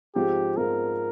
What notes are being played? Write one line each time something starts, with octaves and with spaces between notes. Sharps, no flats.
G#2 F3 C4 F4 G4 G#4
G#2 F3 C4 F4 G#4 A#4